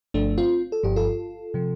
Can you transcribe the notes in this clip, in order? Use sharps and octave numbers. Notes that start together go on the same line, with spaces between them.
G1 G2 F3 A3 D4
C4 F4
A4
G1 G2 F3 G4
F4 A4
C3 F3